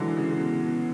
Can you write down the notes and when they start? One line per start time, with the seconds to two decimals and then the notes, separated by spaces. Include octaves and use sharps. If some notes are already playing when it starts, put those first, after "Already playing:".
Already playing: D3 E3 F#3 G#3
0.16 C#3
0.30 C#3
0.40 B2
0.63 B2